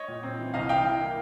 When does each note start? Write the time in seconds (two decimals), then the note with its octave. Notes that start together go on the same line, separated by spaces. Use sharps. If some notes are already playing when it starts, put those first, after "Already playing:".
Already playing: C#5 D#5
0.08 A#2
0.23 C4
0.38 E3
0.54 C2 D#5 F5
0.69 E3 F5 G5
0.85 E3
1.01 A#3